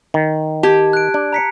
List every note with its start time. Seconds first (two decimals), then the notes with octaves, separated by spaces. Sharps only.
0.14 D#3
0.63 G4 A5 G#6
0.93 F#6 D7
1.14 D4
1.33 A#5 B6 C#7